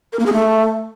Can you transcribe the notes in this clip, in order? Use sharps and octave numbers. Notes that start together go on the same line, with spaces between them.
A#4
A#3
G#4
A3